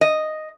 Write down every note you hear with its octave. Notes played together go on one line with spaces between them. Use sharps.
D#5